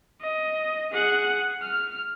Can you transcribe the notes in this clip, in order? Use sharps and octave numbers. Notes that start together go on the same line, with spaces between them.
D#5
G#4 F#5
F6